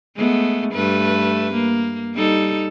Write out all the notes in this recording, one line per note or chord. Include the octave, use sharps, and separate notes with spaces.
G#3 A3 B3
G2 A3 B4
A#3
G3 D#4 A4